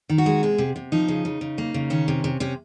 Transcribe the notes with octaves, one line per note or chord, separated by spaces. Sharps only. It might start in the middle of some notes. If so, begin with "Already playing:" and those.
D#3
F#4
G#3
C3 G#4
C3
C3
F3 D#4
C#3
C#3
C#3
A#3
C#3
D#3 C#4
C3
C3
C3 C#4